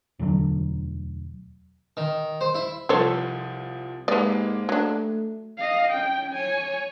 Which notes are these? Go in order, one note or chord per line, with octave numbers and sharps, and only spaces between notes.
E1 D2 D3 F#3
D#3
C5
E4
C2 F3 A4 C5 C#5
G#2 G#3 A#3 B3 G4 D5
F#3 A3 D4
D#5 F5
C#4 G5
C#5 G#5